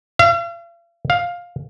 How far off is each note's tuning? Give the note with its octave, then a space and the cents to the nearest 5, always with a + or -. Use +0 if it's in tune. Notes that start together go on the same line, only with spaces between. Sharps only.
F5 -45
F5 +10